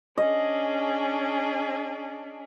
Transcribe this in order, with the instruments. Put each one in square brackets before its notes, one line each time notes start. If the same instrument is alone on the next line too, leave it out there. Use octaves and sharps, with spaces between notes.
[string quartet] C#4 D4 G#4 [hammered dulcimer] D#5